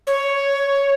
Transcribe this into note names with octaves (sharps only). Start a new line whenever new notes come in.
C#5